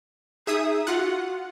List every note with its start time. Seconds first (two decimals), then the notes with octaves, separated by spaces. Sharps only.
0.47 D#4 G#4 E5 D#6
0.87 F4 F#4 F#5